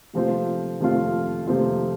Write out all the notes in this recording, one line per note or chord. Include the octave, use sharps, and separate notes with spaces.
C3 F3 A3 C4 F4
C3 F3 A3 C4 F4
C3 F3 A3 C4 F4